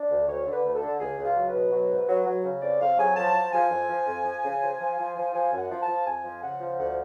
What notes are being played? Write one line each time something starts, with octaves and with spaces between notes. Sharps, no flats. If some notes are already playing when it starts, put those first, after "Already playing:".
Already playing: D4
D2
D2 C#5
D3
B4
D2
A4
D3
C#2 G#4
C#2
F4
F#3
B4
B2
F#3
G#2
F#3
F#3
C#3
F2 D5
F2 F5
F#3 G#5
F3 A5
F3
F3 G#5
F2
F3
F2
F3
C#3
F3
F3
F3
F3
F3 G#5
F#2
F#5
F3
A5
F3
F2 G#5
F3
C#3 F#5
F3
D2 F#5